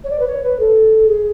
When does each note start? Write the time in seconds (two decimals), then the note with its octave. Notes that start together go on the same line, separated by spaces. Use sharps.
0.04 C#5
0.10 D5
0.20 B4
0.27 C#5
0.43 B4
0.59 A4
1.08 G#4